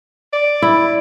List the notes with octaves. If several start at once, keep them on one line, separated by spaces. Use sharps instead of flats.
D5
E4